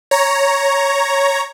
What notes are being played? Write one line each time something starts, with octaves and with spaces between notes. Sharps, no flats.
C#5 A#5